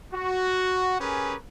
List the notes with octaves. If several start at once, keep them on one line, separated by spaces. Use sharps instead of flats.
F#4
C#4 G4 G#4 A#4 B4